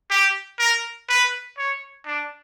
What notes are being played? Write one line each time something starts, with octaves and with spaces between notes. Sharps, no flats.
G4
A#4
B4
C#5
D4